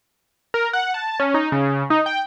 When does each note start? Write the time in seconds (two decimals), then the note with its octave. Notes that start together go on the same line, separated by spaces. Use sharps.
0.54 A#4
0.73 F#5
0.94 A5
1.20 C#4
1.34 D#4
1.52 C#3
1.90 D#4
2.06 G5